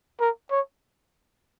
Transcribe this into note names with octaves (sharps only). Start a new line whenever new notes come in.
A#4
C#5